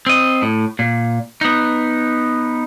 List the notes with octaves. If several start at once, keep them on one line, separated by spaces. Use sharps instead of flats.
C4 D#5
A2
A#2
B3 D#4